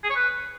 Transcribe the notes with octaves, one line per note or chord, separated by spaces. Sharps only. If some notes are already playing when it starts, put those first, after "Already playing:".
G#4
C#5
B4